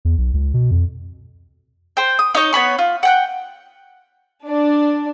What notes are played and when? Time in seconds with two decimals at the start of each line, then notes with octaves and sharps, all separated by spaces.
0.05 E2
0.18 B1
0.34 C#2
0.54 B2
0.71 F2
1.97 C5 G5
2.19 D#6
2.35 D#4 C#5 D#5
2.53 B3 C#5 B5 C#6
2.79 F4
3.03 F#5 G5 F#6
4.46 D4